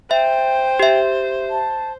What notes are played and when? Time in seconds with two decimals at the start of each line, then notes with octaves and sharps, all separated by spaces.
0.11 C5 E5 G5
0.80 G4 E5
1.50 A5